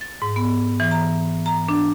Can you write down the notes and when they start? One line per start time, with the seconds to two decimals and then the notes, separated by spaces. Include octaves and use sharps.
0.01 A6
0.22 G#2
0.36 B3
0.80 E3
0.91 A#5
1.46 A#5
1.68 D4